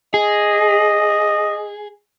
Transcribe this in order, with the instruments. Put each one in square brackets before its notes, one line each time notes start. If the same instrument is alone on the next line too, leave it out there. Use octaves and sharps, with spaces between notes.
[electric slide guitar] G#4 [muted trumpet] D#5